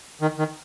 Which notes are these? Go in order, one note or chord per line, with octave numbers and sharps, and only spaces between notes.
D#3
D#3